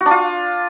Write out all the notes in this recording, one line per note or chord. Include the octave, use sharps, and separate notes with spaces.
F#4
D4
F4